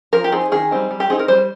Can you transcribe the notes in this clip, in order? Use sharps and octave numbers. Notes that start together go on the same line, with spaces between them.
F3 A#4
G4
C4 D#4 G#4
D#3 G#4
G3 C4 D#4
G3
G4
C4 D#4 G#4
A#4
G3 C5